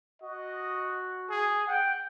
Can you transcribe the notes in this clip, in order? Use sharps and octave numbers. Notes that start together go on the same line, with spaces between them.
F#4 D#5
G#4
F#5 G5